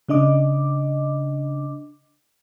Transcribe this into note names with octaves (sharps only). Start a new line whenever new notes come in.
C#3 D4 D#5 D6